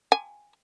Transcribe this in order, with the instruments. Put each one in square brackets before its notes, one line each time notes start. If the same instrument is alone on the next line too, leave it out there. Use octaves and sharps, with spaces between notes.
[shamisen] G#5